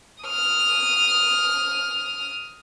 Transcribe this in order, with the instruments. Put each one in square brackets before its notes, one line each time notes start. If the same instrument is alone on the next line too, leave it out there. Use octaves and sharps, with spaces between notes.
[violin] D#6 F6